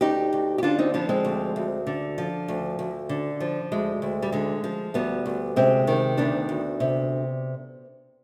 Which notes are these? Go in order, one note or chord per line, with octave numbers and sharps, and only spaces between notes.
D2 D#4 G4
D2
G4
D3 D4 F4
C4 D#4
F3 B3 D4
G#3 C4
D2
D2
D3
F3
D2
D2
D3
F3
D2 G#3
D2
G3
D3 G#3
F3
D2 G3 B3
D2
C3 G#3 C4
D#3
D2 B3 D4
D2
C3